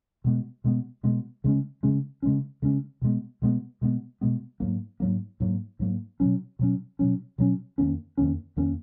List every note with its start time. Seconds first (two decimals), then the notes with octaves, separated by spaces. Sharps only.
0.24 B2 G#3 B3
0.64 B2 G#3 B3
1.03 B2 G#3 B3
1.44 C#3 G#3 C#4
1.83 C#3 G#3 C#4
2.22 C#3 G#3 C#4
2.62 C#3 G#3 C#4
3.01 B2 G#3 B3
3.42 B2 G#3 B3
3.81 B2 G#3 B3
4.21 B2 G#3 B3
4.60 G#2 F#3 A#3
5.00 G#2 F#3 A#3
5.40 G#2 F#3 A#3
5.79 G#2 F#3 A#3
6.20 B2 F#3 C#4
6.59 B2 F#3 C#4
6.99 B2 F#3 C#4
7.38 B2 F#3 C#4
7.78 F2 D#3 A#3 C#4
8.17 F2 D#3 A#3 C#4
8.56 F2 D#3 A#3 C#4